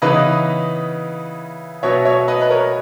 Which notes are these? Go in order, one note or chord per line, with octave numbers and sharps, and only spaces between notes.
C#3 E3 B3 D#4 B4 D#5
B2 F#3 B3 C#5 E5
C#5 E5
B4 D#5
B4
A#4 C#5